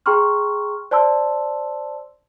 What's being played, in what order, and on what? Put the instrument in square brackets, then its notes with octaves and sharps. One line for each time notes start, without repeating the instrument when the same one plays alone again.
[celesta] G#4 G5 A#5 C6 C#6 F6
C5 D5 A5 C6 E6